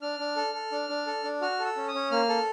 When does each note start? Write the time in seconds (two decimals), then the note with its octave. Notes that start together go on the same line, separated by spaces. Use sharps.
0.02 D4 F6
0.19 D4
0.36 A4
0.54 A4
0.72 D4
0.89 D4
1.07 A4
1.24 D4
1.41 F#4 F6
1.59 A4
1.65 E6
1.77 C#4
1.88 D#6
1.94 C#4
2.11 A#3 F6
2.29 A4